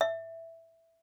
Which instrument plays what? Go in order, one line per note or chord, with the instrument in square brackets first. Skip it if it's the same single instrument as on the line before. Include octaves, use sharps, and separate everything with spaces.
[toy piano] E5